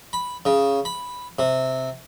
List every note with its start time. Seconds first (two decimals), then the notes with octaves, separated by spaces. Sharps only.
0.13 B5
0.45 C#3
0.85 B5
1.39 C3